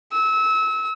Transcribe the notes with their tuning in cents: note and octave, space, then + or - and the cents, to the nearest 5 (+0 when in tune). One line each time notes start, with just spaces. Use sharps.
E6 -30